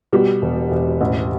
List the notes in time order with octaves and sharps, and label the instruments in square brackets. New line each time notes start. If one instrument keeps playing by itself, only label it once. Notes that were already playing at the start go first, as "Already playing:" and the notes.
[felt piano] B2 G3
E1
E1
A1